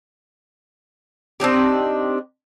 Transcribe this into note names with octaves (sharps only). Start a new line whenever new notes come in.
C4 D4 D#4 G4